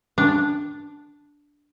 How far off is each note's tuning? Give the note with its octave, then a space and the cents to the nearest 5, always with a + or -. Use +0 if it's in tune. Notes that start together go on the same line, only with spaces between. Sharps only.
D4 -5